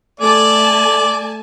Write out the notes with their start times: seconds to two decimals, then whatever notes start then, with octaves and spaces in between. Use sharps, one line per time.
0.20 A3 D5 G#5 A5